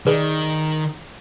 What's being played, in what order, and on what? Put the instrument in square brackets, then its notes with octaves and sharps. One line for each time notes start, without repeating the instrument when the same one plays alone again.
[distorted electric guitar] D#3 [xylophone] G#4 B4 D5